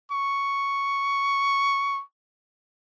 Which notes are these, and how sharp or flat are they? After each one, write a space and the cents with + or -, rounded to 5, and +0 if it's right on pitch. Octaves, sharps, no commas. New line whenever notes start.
C#6 +5